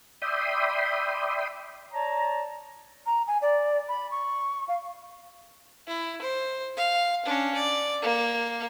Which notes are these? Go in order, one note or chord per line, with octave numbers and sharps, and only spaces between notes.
D5 E5 G5 B5 C6 D#6
C#5 D5 A5 A#5
A#5
G#5
D5
B5
C#6
F5
E4
C5
F5
C#4 D4
D5
A#3